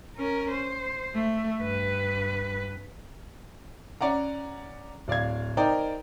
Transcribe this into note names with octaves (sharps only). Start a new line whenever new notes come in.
C#4 A#4
C5
A3
G2 B4
C#4 D5 F#5 A#5
D1 D5 F5 G#6
D#4 A#4 C5 D5 G5